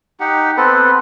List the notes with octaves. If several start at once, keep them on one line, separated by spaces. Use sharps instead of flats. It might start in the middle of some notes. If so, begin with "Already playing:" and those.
D#4 G4 F#5
B3 C4 A4 B4